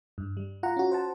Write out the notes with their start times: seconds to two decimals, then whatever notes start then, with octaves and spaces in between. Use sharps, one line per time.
0.18 G2
0.37 G3
0.63 F4 F#5 A#5
0.77 C#4 F#4
0.91 C5 F#5 A5